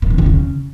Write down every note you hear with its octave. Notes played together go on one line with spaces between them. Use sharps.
A#2
E3
E2
C#3